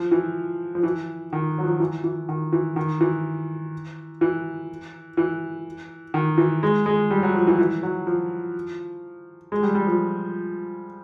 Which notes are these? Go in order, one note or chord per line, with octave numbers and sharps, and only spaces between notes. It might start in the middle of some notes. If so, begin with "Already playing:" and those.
Already playing: F3
E3
F3
E3
D#3
F#3
F3
E3
E3
D#3
E3
D#3
E3
E3
E3
D#3
E3
G#3
G#3
G3
F#3
F3
E3
E3
F#3
F3
G#3
G3
G3
F3